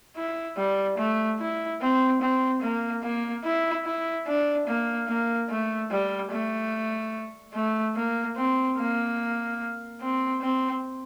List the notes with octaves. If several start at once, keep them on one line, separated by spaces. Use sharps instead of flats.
E4
G3
A3
E4
C4
C4
A#3
A#3
E4
E4
D4
A#3
A#3
A3
G3
A3
A3
A#3
C4
A#3
C4
C4